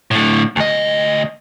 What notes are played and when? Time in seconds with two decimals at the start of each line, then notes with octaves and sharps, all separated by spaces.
0.11 A2 D3
0.56 D2 D#5